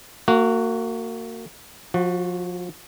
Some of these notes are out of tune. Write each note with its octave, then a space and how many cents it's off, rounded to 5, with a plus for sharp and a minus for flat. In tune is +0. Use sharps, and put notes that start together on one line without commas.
A#3 -30 F#4 +0
F3 +30 F#4 +0